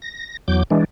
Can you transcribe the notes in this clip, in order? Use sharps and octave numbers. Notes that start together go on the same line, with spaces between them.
A#6
E2 F#3 D6 G6
E3 G#3 D4